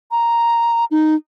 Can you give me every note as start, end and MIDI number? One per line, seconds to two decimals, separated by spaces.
0.11 0.85 82
0.91 1.15 63